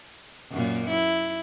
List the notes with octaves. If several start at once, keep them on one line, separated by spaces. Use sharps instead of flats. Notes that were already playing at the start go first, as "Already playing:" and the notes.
F#2 A#2
E4